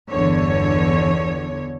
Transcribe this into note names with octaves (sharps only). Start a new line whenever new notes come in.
G1 E2 D3 C#5